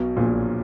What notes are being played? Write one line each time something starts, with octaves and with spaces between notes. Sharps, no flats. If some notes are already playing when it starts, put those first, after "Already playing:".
Already playing: B1 B2
A#1 A#2